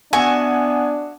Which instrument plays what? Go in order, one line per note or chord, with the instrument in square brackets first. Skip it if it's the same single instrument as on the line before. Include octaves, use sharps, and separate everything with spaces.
[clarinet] B3 [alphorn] D4 [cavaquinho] F#4 E5 C#6 [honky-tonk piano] G#5